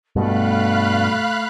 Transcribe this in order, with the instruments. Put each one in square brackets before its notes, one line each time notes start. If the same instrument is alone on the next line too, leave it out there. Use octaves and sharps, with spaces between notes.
[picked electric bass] G2 B2 [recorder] A3 [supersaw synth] F5 B5 F#6